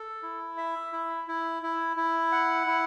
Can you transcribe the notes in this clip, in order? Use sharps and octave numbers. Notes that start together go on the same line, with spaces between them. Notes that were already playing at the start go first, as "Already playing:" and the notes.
Already playing: A4
E4
E5
E4
E4
E4
E4
F#5
E4